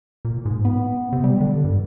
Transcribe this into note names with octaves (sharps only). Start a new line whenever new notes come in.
A#2
G#2
B3
C3
G3
D3
G2